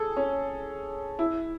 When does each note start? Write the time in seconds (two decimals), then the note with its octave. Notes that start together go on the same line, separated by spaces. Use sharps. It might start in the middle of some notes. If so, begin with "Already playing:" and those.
Already playing: G#4 A4
0.17 C#4
1.19 E4